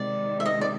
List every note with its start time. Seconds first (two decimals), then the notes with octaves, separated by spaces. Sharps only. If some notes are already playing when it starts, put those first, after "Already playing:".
Already playing: C3 D#3 G#3 D5
0.40 E5
0.46 D#5
0.61 D5